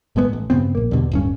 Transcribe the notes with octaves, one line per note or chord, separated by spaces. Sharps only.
G#1 A2 G#3 B3
A1
G2 C#3 B3 C4
A#1 A#3
E2 G2 B2 D3
D1 G2 C#4